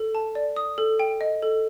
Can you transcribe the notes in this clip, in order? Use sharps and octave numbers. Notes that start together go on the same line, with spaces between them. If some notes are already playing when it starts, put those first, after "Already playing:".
Already playing: A4
A5
D5
D#6
A4
G5
D#5
A4